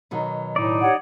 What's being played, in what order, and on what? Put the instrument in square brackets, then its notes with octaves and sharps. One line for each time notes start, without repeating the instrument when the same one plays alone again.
[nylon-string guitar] B2 D#3 F#3
[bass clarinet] A2 [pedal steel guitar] D#4 D5
[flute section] G4 C#5 F#5